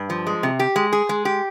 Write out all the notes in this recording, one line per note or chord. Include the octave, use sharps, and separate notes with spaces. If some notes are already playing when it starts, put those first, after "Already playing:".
Already playing: G2
F3
G#3
C3
G4
G#3
G#4
G#3
G4